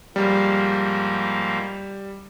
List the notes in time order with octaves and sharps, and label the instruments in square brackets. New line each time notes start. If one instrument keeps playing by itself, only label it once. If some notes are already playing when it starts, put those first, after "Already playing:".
[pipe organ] G#2 F3 A#3 [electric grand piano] G3